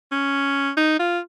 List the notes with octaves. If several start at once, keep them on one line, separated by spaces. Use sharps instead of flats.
C#4
D#4
F4